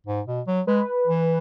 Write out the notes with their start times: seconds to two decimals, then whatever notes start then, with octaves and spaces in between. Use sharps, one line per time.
0.07 G#2
0.27 B2
0.47 F#3
0.67 G#3 B4
1.08 E3